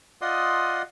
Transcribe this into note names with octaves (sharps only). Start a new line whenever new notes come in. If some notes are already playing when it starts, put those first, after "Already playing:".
F4 D5 D#5 F#5 C6 D#6